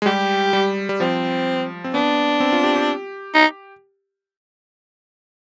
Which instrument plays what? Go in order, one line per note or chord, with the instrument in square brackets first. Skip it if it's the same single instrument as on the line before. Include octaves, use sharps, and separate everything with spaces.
[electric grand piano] G#3
[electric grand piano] G3 [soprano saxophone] G4
[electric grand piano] G3
G3
[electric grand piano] F3 [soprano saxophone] C4
[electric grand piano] C4
[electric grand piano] B3 [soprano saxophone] D4
[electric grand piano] C4
F4
G4
G4
[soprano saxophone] D#4